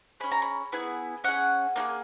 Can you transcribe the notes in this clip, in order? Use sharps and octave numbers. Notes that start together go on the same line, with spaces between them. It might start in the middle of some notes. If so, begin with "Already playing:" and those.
C#4 G#4 B5
A#5
B5
B3 E4 G#4
C#4 G#4 F#5
A#3 D#4 G#4